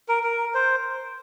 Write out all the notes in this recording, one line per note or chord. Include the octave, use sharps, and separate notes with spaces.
A#4
A#4
C5